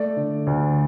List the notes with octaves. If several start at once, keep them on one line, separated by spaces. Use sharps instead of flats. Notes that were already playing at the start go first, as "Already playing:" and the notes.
Already playing: A3 D5
D3
D2